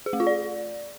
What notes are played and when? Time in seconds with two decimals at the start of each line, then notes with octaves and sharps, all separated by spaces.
0.06 G#4
0.13 A3
0.20 F4
0.27 D5